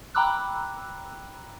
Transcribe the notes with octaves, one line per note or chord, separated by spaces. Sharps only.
G5 A#5 B5 D6 E6 F#6